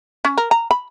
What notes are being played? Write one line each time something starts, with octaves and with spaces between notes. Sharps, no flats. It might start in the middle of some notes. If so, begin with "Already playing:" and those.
C#4
A#4
A#5
B5